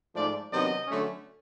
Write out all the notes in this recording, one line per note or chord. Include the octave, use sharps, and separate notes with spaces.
G#2 F3 A3 D5
C3 D#3 F#3 B3 D4 D#5
D3 F#3 A3 C#4